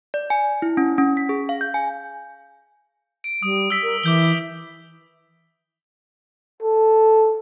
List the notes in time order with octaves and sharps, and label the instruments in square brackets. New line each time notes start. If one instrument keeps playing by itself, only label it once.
[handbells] D5
G#5
E4
C#4
C#4
B6
G#4
F5
G6
G#5
[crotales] D7
[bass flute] G3 [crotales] D#6
[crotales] E6 B6
[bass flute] A#4
[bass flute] E3 [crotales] D6 G6 G7
[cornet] A4